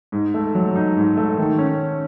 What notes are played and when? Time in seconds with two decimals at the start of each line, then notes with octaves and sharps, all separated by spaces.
0.12 G#2
0.34 A3
0.55 F#3
0.76 D#4
0.97 G#2
1.17 A3
1.37 D#3
1.58 C#4